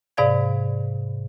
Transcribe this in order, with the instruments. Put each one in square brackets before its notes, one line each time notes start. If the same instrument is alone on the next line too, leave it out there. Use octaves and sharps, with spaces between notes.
[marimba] G#2 C3 D5 F5 G#6